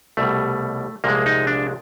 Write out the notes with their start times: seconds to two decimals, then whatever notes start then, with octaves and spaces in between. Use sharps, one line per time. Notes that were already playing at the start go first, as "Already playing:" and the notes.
0.17 C2 B2 G3 A3
1.04 C2 A#2 F3 G#3 A#3
1.26 D#4
1.47 D4